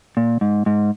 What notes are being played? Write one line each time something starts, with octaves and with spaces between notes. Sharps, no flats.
A#2
G#2
G#2